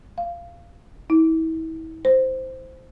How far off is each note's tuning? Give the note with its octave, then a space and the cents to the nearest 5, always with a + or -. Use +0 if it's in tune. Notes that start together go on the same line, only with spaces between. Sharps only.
F5 -15
E4 -35
C5 -5